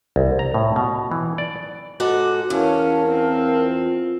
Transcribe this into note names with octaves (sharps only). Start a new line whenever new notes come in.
C2
A#5
A2
B2
E3
D5
G#2 F#4 A4 D6
E2 C#4 E4 A#4 F5 A5
C4
F4